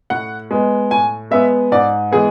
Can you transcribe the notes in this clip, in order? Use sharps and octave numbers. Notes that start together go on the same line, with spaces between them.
A2 F#5
G#3 B3
A2 G#5
G#3 B3 E5
G#2 D5
E3 G#3 B3 G#4